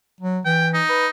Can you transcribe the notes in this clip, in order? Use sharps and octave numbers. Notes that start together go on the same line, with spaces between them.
F#3
E3 G5
D#4
B4